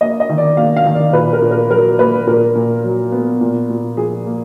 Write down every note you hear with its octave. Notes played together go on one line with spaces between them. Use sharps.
A#3 D#5
D#5
D#3
D5
A#3 F5
F5
D#3
D5
A#2 B4
A#4
A#2
A#4
F#3 A#4
A#3 B4
A#2 A#4
A#2
F#3
B3
A#2
A#2
F3 G#4
A#3